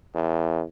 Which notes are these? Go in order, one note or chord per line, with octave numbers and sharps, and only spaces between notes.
E2